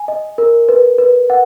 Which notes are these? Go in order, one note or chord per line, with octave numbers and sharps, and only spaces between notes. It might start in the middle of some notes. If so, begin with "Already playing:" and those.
Already playing: G#5
D#5
A#4
B4
B4
F#5